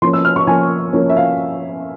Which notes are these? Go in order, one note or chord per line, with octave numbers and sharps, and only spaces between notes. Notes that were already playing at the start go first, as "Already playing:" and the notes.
F3 A#3 C#4 C6
E6
F6
C#6
F3 A#3 C#4 G#5
F3 A#3 C#4
E5
F5